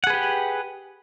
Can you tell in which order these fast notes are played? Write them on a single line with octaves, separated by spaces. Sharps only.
F#5 G#4 B4 G4